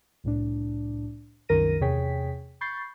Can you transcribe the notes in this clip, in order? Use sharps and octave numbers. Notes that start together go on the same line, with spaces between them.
C2 A2 D4
C2 F#2 D#3 A#4 A#6 D#7
E2 C3 G#4 C#5 G5 B6
B5 C#6 G6 A6 C7